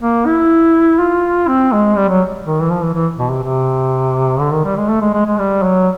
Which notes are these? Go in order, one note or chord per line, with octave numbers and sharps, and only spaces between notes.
A#3
E4
F4
C4
G#3
G3
F#3
D#3
E3
F3
E3
E3
B2
C3
C3
D3
D#3
G3
G#3
A3
G#3
G#3
G#3
G3
F#3